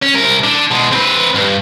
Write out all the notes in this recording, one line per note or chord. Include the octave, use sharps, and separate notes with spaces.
C#4
C2 A#4
D3
B2 G#3
C4 B4
G2